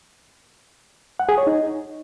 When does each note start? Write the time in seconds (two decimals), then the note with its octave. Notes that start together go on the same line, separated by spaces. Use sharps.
1.20 F#5
1.29 G#4
1.38 C#5
1.47 D#4